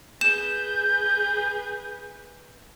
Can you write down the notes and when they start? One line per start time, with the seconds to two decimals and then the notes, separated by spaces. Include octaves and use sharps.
0.21 G#4 B4 G6 E7